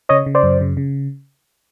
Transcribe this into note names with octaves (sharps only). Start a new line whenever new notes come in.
C#3 C#5 D#5
C#3
C5 D5
F#2
C#3
C#3